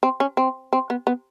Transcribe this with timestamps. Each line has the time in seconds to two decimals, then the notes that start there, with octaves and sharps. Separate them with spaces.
0.03 C4
0.20 C#4
0.37 C4
0.73 C4
0.90 B3
1.07 B3